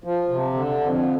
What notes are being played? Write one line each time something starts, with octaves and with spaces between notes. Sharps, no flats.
F3
C3
D3
F2